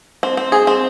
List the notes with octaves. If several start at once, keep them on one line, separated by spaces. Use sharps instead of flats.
C4
C4
G#4
C4